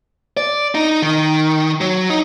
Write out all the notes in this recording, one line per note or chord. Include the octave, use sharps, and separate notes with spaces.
D5
D#4
D#3
F#3
D#4